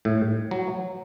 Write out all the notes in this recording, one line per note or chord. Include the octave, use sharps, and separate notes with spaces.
A2
F#3